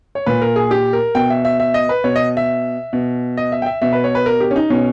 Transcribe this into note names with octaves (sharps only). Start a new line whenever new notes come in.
C#5
A#2 B4
A#4
G#4
G4
A#4
B2 G5
E5
E5
E5
D#5
B4
B2 C#5
D#5
E5
B2
D#5
E5
G5
E5
B2 E5
B4
C#5
B4
A#4
G4
C#4
D#4
B2 C#4